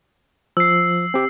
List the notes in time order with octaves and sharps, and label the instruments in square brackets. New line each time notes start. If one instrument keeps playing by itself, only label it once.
[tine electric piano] F3 [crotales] E6 C7
[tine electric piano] C4 G4